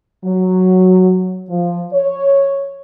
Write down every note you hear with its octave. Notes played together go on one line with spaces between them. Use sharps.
F#3
F3
C#5